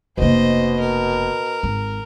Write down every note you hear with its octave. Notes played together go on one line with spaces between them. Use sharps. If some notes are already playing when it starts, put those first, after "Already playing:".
F1 B2 A#3 C5 D#5
A#4
G#1